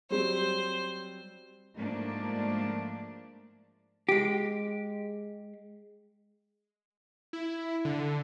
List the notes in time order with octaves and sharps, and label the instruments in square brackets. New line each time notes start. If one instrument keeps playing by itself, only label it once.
[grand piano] F#3 G3 C4 [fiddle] C5
[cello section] G#2 F3 A3 A#3 D4
[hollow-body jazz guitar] G#3 G4
[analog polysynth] E4
D3